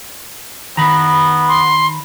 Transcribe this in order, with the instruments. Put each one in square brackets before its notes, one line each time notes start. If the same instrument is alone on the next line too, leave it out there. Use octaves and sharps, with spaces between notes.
[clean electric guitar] D#3 B4 [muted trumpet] B3 [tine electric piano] A#5 B5
[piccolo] C6